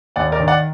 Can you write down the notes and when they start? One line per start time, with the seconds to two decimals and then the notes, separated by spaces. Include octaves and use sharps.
0.16 D#2 D5 F#5
0.32 A#4 D5
0.40 D#3
0.48 D5 F#5